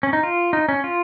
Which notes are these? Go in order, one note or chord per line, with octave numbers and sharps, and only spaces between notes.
C#4
D#4
F4
D#4
C#4
F4